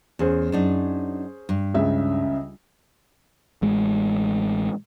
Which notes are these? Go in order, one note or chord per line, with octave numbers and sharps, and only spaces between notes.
E2 C#4 G#4 C5
F#2 D4 D#4
G2
C#2 C#3 E5
A1 G#3